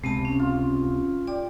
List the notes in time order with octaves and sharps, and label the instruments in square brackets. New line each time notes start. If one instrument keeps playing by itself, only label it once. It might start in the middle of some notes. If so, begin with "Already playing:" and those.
[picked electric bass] C#2 C3 [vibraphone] G#3 B3 A5
[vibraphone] C#4
[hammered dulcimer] F4
[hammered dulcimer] G4 [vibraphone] D5